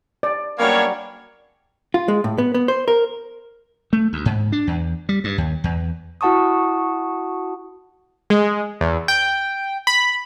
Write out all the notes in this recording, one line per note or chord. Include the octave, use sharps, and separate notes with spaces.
D5
F#3 G3 A#3 B3 C#4 D4 C#5
F4
G#3
A2
B3
B3
C5
A#4
A3
D2
G#2
D4
E2
G3
G2
D#2
E2
E4 F#4 F#5 A5 C#6 D#6
G#3
E2
G5
B5